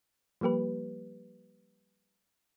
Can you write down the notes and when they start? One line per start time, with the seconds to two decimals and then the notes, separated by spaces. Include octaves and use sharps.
0.41 F3 G3 A#3 G4 B4